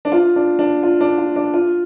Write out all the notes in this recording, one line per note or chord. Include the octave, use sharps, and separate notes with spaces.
D4
F4
D4
D4
F4
D4
F4
D4
F4